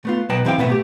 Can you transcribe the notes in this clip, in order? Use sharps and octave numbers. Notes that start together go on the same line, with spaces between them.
A3 B3 F4
B1 F#3 B4 D#5 G5 A5
C#2 E3 C4 E4 F5 G5
B1 A2 B3 E5
A3 G4